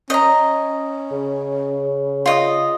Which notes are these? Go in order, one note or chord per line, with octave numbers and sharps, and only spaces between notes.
C#4 D#5 A#5
C#3
F4 D#5